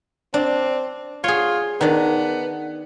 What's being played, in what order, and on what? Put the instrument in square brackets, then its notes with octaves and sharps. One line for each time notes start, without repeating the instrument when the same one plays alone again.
[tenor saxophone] C4 [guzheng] D4
[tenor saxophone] F4 [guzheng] G#4 C#5
[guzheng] D#3 D4 [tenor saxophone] B3